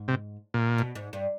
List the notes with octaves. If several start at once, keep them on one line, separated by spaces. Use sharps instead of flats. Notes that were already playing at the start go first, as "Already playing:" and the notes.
Already playing: G#2
C3
A#2
B2
G#2
G2